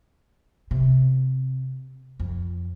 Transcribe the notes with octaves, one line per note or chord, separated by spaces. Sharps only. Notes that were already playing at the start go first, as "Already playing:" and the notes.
C3
F2